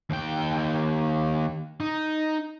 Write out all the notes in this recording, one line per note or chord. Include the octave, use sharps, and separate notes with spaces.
D#2 G5
D#4